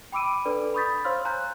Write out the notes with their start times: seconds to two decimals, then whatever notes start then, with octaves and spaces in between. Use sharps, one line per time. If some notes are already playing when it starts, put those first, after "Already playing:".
0.12 G5 B5 D6 E6 D7 D#7
0.45 D4 A4 B4 D5
0.74 B5 C#6 D#6 G6 A6 B6
1.04 C5 C#5 F5 C6 E6 F6
1.25 G#5 A#5 F#6 G6